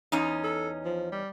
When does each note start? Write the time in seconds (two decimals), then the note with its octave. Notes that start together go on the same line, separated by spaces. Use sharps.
0.12 E2 C#4 D#4
0.44 A4
0.85 F3
1.12 G3